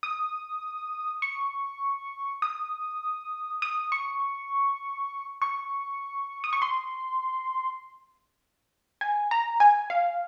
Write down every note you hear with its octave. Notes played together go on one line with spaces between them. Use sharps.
D#6
C#6
D#6
D#6
C#6
C#6
D#6
C#6
C6
G#5
A#5
G#5
F5